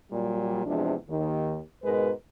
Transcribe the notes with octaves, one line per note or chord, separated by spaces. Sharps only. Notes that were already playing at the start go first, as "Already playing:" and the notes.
A#2 F#3 G3
E2 C3 F3 G#3 D4
D#2 D#3
G#2 B2 G#3 A#4 B4